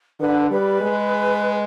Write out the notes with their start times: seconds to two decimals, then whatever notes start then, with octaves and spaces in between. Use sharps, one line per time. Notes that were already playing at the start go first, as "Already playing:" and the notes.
0.20 D3 B4
0.51 G3 B4
0.81 G#3